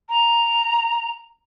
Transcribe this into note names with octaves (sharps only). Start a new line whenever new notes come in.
A#5